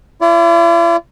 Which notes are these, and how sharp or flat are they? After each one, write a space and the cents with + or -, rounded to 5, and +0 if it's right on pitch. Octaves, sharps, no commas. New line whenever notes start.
E4 +45 D5 -30